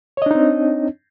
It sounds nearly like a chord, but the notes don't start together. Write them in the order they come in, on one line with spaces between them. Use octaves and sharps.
C#5 D#5 D4 D#4 C4